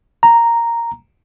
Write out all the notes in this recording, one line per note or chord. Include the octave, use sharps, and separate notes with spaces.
A#5